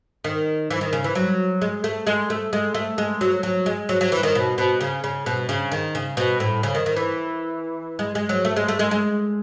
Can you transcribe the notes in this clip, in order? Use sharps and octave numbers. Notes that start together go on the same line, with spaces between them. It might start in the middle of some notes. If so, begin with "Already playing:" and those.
D#3
E3
D#3
C#3
E3
F#3
G#3
A3
G#3
A3
G#3
A3
G#3
F#3
F#3
G#3
F#3
F#3
E3
D#3
B2
B2
C#3
C#3
B2
C#3
D#3
C#3
B2
A2
C#3
D#3
D#3
E3
G#3
G#3
F#3
A3
G#3
A3
G#3
G#3